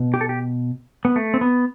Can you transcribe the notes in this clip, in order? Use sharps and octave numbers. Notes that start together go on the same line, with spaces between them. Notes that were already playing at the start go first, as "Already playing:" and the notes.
Already playing: B2
G4
A4
G4
B3
A3
C4
B3